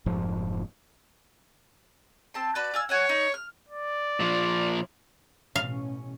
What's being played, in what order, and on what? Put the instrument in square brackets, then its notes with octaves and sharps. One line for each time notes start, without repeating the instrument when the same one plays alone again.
[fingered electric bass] F1 G#2 F3
[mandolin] C4 A5 C6
[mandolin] F#4 B4 A5 [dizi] D5
[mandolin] F4 G#5 E6
[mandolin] F#4 F#5 G#5 [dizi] C#5
[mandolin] D#4
F6
[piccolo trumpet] D5
[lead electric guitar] A#2 F3
[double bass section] A1 B2 C#4 [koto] F5